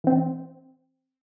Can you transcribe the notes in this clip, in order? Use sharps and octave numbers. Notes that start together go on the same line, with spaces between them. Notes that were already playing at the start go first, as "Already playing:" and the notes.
E3 C4